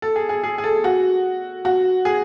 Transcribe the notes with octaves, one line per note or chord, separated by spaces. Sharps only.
A4
G#4
G#4
G#4
G#4
A4
F#4
F#4
G#4